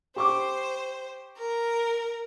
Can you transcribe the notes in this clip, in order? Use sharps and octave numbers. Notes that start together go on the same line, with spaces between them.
G4 C5 C#6 D6
A#4